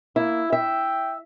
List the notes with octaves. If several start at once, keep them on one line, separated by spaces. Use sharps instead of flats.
A#3 E4
E5 G5